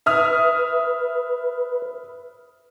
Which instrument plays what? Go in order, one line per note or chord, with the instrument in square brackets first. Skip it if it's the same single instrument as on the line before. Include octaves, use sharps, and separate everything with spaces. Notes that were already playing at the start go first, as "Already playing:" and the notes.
[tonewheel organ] B4 [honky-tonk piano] E5 D#6 F6